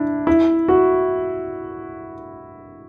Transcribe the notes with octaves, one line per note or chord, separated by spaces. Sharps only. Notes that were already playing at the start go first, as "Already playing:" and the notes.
Already playing: D4 E4
E4
F#4